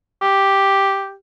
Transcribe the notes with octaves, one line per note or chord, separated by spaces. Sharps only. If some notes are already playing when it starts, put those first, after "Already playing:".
G4